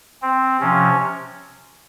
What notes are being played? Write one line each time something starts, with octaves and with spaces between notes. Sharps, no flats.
C4
C3 F3 C#4